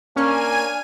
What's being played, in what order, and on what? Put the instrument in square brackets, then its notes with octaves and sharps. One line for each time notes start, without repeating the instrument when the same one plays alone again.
[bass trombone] A#3 [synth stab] C#4 [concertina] D4 F6 [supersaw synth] G#5 D#7